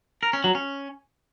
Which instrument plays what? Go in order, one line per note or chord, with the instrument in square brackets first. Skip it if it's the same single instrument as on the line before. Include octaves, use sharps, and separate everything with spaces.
[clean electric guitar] A#4
C#4
F#3
C#4